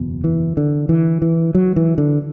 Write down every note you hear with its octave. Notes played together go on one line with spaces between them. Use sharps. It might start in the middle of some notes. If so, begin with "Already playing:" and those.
Already playing: F#1 E2 B2
E3
D3
E3
E3
F#3
E3
D3